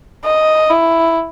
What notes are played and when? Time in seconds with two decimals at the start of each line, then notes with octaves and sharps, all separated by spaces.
0.24 D#5
0.70 E4